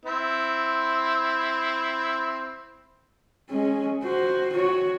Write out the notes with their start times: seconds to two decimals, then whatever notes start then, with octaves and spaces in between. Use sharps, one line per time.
0.05 C4 E4
3.50 G#3 C#4
4.04 F#4 C5
4.53 F#4 C#5